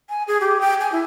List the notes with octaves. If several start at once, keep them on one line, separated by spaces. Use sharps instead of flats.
G#5
G#4
G4
G5
G#5
E4